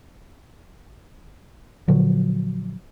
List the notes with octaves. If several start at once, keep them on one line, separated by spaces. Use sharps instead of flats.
A#2 D3 F3 F#3